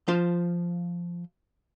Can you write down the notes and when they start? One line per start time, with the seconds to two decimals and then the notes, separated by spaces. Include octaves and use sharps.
0.08 F3 F4 C5 A5